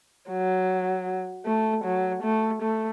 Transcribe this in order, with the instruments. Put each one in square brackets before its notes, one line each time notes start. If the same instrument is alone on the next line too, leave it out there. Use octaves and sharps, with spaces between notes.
[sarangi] F#3
A3
F#3
A3
A3